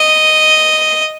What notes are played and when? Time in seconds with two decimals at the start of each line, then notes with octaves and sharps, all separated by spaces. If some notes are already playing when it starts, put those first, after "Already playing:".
Already playing: D#5